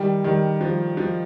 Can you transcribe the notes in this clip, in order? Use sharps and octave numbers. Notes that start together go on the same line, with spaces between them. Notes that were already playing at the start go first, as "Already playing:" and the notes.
Already playing: D#3 G3
D#3 G3
F3
F3